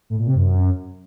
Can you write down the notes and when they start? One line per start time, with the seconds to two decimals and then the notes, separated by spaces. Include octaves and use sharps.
0.10 A2
0.18 A#2
0.27 C3
0.35 F#2